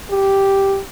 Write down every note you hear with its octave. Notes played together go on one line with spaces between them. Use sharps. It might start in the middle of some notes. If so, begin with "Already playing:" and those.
G4